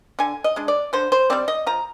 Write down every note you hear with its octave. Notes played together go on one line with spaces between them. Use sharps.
D3 G#5
D#5
G#3 D4
D5
D3 C5
C5
G3 C4 D5
D#5
F3 A#5